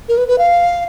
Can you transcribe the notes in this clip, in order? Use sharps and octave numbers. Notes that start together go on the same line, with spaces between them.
A#4
B4
B4
F5